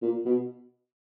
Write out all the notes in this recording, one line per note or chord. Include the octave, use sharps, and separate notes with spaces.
A#2
B2